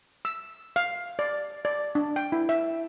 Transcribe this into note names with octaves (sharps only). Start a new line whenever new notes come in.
E6
F5
D5
D5
D4
G5
E4
E5